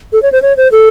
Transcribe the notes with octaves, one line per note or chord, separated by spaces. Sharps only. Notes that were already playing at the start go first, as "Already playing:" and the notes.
A4
C#5
C5
C#5
C5
A4